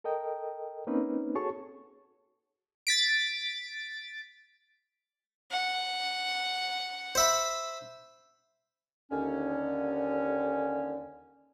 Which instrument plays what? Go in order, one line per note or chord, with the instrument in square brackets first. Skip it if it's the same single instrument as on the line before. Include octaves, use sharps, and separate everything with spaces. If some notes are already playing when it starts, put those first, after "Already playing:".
[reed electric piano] A4 A#4 D#5 G5
A#3 C4 C#4 D#4 B4
F#4 G#4 A4 C#5 A5 C#6
[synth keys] A6 B6 D7
[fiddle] F#5
[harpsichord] C5 E5 B5
[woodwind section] D#2 D3 C#4